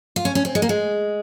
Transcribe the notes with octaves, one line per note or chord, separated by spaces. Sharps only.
F4
C#4
C#4
C4
G#3
A#3
G#3